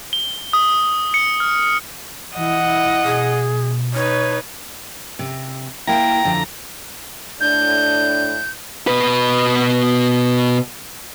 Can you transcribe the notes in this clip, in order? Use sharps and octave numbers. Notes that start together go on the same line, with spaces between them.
G7
D#6
C#7
F6
E3 E4 D#5 F#5
E4
B2 G#4
D#4 B4 C#5
C3
A#3 E4 G5 A#5
F2 D3
A2 D4 G6
B2 B4